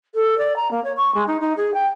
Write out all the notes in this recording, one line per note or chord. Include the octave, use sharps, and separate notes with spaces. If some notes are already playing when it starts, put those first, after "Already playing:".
A4
D5
A#5
A#3
C#5
C#6
G#3
D#4
D#4
G#4
G5